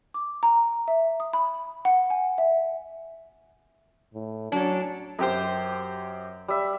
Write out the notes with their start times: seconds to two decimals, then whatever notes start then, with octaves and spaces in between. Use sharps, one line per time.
0.14 D6
0.43 A#5
0.88 E5
1.20 D#6
1.33 B5
1.85 F#5
2.10 G#5
2.38 E5
4.14 A2
4.52 F#3 C#4 D4
5.19 F#2 G4 C5
6.48 G3 E5